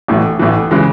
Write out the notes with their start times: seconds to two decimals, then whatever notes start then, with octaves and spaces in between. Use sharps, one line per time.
0.08 A1 A2 E3
0.39 A1 A2 E3
0.71 C#3 E3 G#3